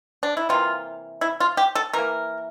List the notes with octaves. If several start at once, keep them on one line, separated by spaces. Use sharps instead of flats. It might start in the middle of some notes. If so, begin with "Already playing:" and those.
D4
E4
C3 E3 A#3 F4
E4
F4
G4
A4
E3 A#3 A#4